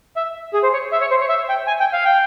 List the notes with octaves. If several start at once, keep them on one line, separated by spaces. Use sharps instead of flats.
E5
G#4
C5
C#5
E5
C#5
C5
C#5
E5
G5
G#5
G5
F5
G5